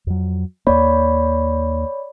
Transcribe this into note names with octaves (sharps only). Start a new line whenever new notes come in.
F2 F#3
D#2 A#3 C#5 D5 B5